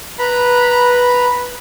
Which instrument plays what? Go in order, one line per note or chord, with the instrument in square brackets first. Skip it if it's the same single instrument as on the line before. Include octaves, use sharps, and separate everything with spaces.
[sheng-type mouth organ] B4 A#5 B5